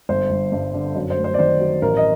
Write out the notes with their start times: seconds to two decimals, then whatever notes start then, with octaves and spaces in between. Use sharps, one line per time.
0.09 G1 C5
0.30 G1
0.52 G2
0.74 D3
0.95 F#2
1.10 C5
1.17 A3
1.24 C5
1.34 D5
1.39 D#3 C5
1.60 F#3
1.82 A1 A#4
1.97 D#5